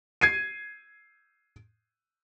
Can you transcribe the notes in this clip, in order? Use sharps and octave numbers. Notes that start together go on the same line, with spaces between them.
G#6 C7 D#7